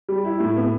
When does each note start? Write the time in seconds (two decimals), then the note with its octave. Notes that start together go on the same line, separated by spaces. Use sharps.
0.09 G3
0.25 E4
0.40 A2
0.57 B3